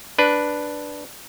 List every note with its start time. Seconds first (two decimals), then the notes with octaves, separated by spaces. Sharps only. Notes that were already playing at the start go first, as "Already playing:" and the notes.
0.18 D4 B4